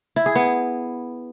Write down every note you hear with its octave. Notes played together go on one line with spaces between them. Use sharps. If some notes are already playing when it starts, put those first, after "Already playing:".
E4
G#4
B3